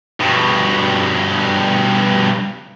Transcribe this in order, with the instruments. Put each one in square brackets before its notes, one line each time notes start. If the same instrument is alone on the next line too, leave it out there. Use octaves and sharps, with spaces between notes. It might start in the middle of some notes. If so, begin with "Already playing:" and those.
[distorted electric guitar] G2 B2